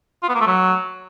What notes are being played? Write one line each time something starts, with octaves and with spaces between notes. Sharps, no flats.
F4
B3
A#3
A3
F#3